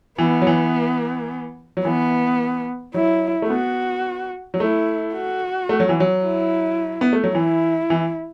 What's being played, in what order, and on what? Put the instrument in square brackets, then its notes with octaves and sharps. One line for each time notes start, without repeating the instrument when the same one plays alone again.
[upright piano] E3 [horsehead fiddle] B3
[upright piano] F#3
E3
F#3
[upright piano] E3 [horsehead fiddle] B3
[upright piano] F#3 [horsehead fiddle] E4
[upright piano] A3
[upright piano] B3 [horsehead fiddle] F#4
[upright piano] F#3
[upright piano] A3 [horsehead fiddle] E4
[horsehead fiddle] F#4
[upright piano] A3
F#3
E3
F#3
[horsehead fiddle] E4
[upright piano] B3
A3
F#3
[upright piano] E3 [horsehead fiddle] E4
[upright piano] E3